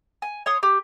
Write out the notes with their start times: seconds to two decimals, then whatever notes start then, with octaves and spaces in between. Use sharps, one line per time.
0.22 G#5
0.46 C#5 C6 D#6
0.63 G4